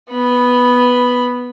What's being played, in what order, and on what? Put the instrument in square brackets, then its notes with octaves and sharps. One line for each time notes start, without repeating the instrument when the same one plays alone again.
[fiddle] B3 B5